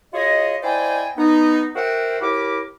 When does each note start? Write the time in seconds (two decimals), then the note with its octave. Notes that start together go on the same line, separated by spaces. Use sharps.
0.13 F4 F#4 G#4 C#5 D#5
0.63 E4 C5 D5 D#5 G5 G#5
1.17 B3 D#4
1.75 F#4 A#4 C5 E5 F#5 G5
2.20 A2 E4 G4 A#4 D6